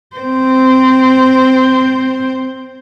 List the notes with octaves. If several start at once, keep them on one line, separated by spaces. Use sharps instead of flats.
C4 C5